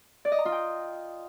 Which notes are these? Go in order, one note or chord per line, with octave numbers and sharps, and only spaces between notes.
D5
D#5
A#5
F4
G5